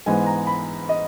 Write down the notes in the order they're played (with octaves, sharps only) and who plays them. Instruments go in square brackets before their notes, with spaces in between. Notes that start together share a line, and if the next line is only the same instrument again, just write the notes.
[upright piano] G#2 E3 G#3 B3 G#5
A#5
B5
D#5